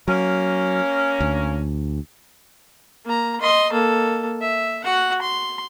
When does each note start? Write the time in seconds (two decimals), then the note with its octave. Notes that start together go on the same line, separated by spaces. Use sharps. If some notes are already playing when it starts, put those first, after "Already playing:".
0.08 F#3 A#3 C#4
1.20 D2
3.05 A#3 A#5
3.41 D#5 C6
3.72 A#3 A4
4.41 E5
4.84 F#4 F#5
5.22 C6